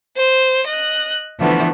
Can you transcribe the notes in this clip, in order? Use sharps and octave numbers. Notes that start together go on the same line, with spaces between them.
C5
D#5 F#6
D3 E3 F3 A3 B3